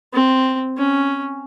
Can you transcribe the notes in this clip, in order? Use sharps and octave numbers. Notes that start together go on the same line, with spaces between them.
C4
C#4